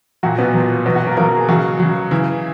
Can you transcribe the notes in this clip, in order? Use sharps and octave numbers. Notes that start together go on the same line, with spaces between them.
A#2 F#3 F#4
B2 B3
A#2 F#3
B2 F#3 B3
F#3 F#4
A#3 A#4
B2 F#3 A#3 A#4
G#4
C#3 F#3 F#4
C#3 F#3
C#3 E3 E4